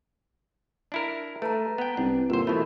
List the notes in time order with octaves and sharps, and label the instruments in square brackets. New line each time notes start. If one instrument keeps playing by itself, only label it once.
[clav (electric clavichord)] D4 E4 A#4
[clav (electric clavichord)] A3 [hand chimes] B4 A5 A#5
[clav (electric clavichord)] B3 G5
[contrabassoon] C2 [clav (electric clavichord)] D4
[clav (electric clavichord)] G1 C5 [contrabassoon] A#2 [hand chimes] A#4
[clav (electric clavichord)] B2 A3 [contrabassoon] E3 [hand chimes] B5